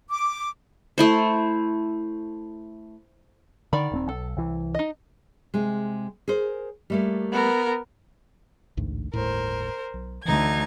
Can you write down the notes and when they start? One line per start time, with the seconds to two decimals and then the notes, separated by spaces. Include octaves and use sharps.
0.11 D6
0.98 A3 E4 C5
3.73 D3 D#3 D5 B5
3.92 D#1 B3 C4
4.09 B1 A4
4.37 C2 E3
4.75 D#4 D#5
5.54 C3 G#3
6.28 G#4 A#4 C5
6.90 G3 A3 A#3
7.32 B3 A#4
8.77 A1 D2 G#2
9.13 G1 D#2 A2 A#4 C5
9.94 B1
10.25 D2 D3 E3 D#4 G#6